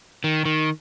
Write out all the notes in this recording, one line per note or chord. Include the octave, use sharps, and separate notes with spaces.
D#3
D#3